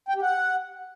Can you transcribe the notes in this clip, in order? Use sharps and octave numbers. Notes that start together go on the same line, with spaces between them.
G5
G4
F#5